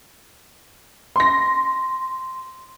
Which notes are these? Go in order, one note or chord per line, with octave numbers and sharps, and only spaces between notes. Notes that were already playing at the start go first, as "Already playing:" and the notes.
C6 A#6